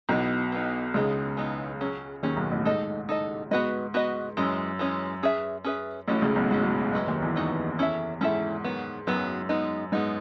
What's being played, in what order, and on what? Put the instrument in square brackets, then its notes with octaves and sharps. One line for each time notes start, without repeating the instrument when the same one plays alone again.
[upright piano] B1 B2 [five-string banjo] E3 B3 D#4
[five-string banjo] E3 B3 D#4
[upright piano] C#2 C#3 [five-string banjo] E3 G#3 B3 D#4
[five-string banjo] E3 G#3 B3 D#4
F#3 C#4 G#4
[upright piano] D#2 D#3 [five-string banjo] F#3 C#4 G#4
[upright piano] B1 B2
A1 A2
[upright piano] G#2 [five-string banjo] D#4 A4 D#5
[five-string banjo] D#4 A4 D#5
[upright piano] G#2 [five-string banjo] B3 F#4 B4 D#5
[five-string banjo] B3 F#4 B4 D#5
[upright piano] F#2 [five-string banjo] E3 G#3 C#4
[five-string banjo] E3 G#3 C#4
C#4 G#4 B4 E5
C#4 G#4 B4 E5
[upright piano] A1 A2 [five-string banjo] F#3 C#4 F#4
[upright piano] C#2 C#3
B1 B2
[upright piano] G#2 [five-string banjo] F#3 C#4 F#4
[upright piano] G#2
[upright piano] F#2 [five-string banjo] G#3 D#4 F#4 B4 D#5
[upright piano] D#2 D#3
E2 E3
[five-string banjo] G#3 D#4 F#4 B4 D#5
C#4 E4 A4 E5
[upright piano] G#2 [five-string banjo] C#4 E4 A4 E5
[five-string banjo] D#3 F#3 B3
[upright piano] F#2 [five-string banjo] D#3 F#3 B3
[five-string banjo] G#3 B3 D#4
[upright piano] G#2 [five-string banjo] G#3 B3 D#4